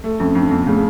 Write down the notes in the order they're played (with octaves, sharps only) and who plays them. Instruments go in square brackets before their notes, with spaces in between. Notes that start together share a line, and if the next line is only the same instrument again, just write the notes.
[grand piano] A3
[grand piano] F2 [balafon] C#4
[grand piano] F2 [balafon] D4
[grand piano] F2 [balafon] B3
[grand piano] C#3 [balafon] A3